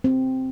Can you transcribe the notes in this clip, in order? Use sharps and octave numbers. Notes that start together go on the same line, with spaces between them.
C4